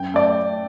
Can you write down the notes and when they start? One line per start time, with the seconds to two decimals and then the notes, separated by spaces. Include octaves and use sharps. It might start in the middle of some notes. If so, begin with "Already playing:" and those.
Already playing: F#2 G5
0.14 A3 D5